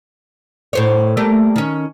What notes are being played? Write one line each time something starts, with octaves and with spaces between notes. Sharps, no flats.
A2 C5 C#5
G3 A3 A#3
D#3 C#4